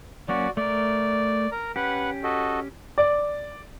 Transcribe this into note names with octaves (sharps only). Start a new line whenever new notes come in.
F#3 A#3 C#4 F#4 D5
A3 A#4 D5
A#4 A#5
C#4 G4 B4 F#5
F#4 A4 D#5
D5